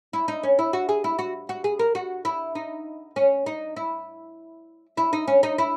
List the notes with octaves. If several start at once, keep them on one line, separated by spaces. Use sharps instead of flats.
E4
D#4
C#4
E4
F#4
G#4
E4
F#4
F#4
G#4
A#4
F#4
E4
D#4
C#4
D#4
E4
E4
D#4
C#4
D#4
E4